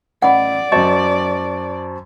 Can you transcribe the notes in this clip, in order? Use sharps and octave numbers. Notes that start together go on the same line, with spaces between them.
A1 D5 F#5 B5
F#2 F#3 C5 D#5 A5 C#6